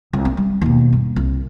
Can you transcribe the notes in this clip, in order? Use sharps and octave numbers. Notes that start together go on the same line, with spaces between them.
C2
C4
G3
D#2 B2
G2
C2